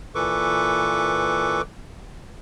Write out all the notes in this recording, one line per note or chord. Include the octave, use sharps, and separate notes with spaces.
A#2 E3 A4 B4 C#6 D6